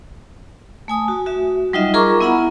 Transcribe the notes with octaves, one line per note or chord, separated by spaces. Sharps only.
A3 G#5 D#6
F#4
F#4 E5
F#3 G3 D#4 F4 D#5 E5
F4 G#4 A#4 A#5 C#6 D6
B3 E4 E5 F#5 A#5 B5